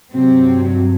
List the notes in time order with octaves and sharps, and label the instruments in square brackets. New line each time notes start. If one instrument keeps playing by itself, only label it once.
[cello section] G2 C3 F#3 C4